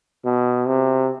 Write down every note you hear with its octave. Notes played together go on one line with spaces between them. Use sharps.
B2
C3